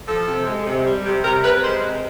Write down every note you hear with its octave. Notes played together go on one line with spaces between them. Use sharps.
F3 A4
C3
G#3
C3
G3
C3
C3 A#4
C3 B4
G#3 C5
C3